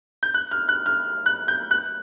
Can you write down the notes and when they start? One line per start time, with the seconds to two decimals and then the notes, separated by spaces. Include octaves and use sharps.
0.23 G6
0.34 F#6
0.51 F6
0.69 F#6
0.86 F6
1.26 F#6
1.48 G6
1.71 F#6